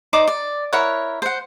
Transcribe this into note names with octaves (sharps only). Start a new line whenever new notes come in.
D#4 C5 D5 D6
D5
E4 A#4 C#5 F#5
C5 F#5